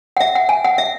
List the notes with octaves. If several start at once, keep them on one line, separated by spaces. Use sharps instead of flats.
F#5
E5
F#5
G#5
F#5
E5